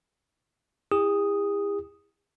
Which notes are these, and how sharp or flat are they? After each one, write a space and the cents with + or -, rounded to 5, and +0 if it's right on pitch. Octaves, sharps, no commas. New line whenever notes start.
E4 +0 G#4 -45 D#6 +0